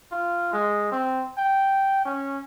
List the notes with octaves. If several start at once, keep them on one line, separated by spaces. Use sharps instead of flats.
F4
G#3
C4
G5
C#4